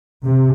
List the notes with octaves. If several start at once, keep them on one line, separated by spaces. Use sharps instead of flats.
C3